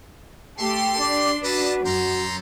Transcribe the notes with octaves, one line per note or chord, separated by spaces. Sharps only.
A3 G4 A4 C6
D4 G4 D5
F#4 A4 B4 D#5 A5
F#2 C#4 G4 A4 A#5 C6